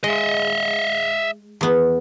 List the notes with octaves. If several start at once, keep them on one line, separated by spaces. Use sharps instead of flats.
G#3 D#5 E5
E2 B3